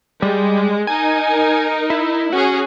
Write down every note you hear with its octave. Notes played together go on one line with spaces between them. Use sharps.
G3 G#3
D#4 A#4 G#5
E4
C#4 F#4 G#4